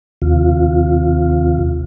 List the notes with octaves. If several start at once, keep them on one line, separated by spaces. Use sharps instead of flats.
D#2 C3 F4